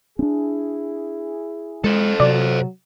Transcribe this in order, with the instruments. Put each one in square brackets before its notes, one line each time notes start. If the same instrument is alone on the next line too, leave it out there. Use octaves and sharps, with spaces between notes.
[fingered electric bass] C#4 D4 [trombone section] E4 G#4
[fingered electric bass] G#3 [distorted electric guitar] A4 C5
[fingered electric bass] C3 [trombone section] F#3 [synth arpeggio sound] D5